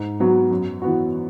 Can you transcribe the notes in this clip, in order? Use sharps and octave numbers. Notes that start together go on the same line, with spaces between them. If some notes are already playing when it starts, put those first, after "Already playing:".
Already playing: G#2
F#3 B3 F#4
F#2
E3 B3 F#4